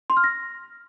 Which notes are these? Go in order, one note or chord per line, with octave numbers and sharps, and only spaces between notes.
C6
F6
A#6